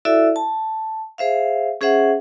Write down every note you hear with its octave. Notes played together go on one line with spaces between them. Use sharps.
E4 F#4 A4 D5 E5
A5
G#4 C5 E5 F5
C#4 G#4 C5 E5 F#5